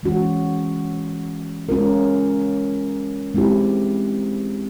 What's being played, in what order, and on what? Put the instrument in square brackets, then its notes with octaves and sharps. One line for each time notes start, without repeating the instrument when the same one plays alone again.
[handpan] E3 G#3 C#4 F#4
G#3 C#4 F4 A#4
G#3 C4 E4 G4